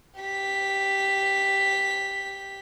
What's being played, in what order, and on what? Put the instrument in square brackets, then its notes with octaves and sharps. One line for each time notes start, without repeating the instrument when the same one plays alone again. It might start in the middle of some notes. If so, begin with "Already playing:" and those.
[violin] G4 B6